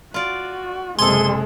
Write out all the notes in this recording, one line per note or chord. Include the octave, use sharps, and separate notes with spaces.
F4 F#4 D5
F#1 C3 G#3 G#4 A4 C6